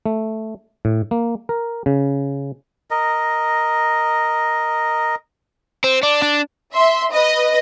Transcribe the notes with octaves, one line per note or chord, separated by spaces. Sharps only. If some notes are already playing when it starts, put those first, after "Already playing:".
A3
A2
A#3
A#4
C#3
A#4 D#5
C4
D4
D4
E5 C6
B4 D#5